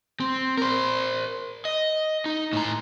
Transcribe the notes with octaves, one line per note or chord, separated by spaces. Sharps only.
C4
A#4 C5
D#5
D#4
A2 A#5